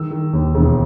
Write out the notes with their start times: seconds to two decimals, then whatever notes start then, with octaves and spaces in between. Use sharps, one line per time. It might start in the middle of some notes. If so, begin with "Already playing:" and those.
Already playing: D#3 E6
0.11 D#3
0.33 D#2
0.55 E1